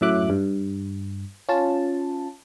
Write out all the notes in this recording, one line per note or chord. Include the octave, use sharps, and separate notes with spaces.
F#2 A2 F#3 E5 D6 F#6
G2
C#4 F4 A5